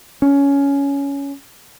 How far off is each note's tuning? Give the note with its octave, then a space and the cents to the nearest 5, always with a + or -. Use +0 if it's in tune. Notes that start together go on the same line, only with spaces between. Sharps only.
C#4 +15